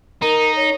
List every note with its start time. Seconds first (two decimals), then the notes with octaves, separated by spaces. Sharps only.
0.22 D#4 A#4
0.56 C#5